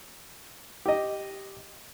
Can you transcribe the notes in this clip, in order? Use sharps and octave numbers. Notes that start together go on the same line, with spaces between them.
G4 D#5